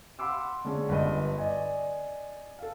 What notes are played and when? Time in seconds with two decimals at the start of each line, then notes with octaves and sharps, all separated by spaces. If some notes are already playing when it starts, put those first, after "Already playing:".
0.19 F5 F#5 B5 C6 D6 E6
0.64 D3 G#3 C#4
0.89 G1 G2 B4 D#5
1.38 D5 D#5 G#5
2.59 A4 F5